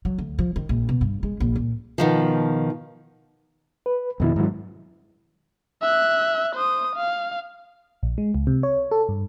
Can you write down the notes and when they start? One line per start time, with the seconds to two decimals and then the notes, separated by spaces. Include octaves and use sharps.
0.05 F#3
0.19 D2
0.39 F3
0.56 D#3
0.69 A#1
0.89 B2
1.01 G2
1.23 G#3
1.40 A#1
1.56 A#2
1.98 B2 D#3 F3
3.86 B4
4.20 F2 B2 D#3 E4
4.36 G#2 F#3
5.82 E5 F#6
6.55 C5 D#6
6.96 F5
8.03 A#1
8.18 G#3
8.35 C#2
8.47 C3
8.63 C#5
8.91 A4
9.09 G2